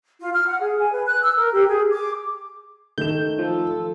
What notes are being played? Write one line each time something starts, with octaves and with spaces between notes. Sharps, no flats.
F4
F6
F#5
G#4
G#5
B4
F#6
E6
A#4
G4
G#4
D6
D#3 A3 G6 E7
F3 F4 A4